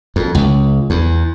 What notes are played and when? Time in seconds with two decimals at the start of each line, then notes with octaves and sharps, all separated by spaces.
0.16 F2
0.35 C#2
0.90 E2